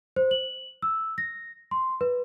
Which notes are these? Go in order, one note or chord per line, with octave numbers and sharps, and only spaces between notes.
C5
F#7
E6
A#6
C6
B4